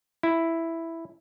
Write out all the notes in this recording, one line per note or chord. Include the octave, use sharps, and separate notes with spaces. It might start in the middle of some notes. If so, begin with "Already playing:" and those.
E4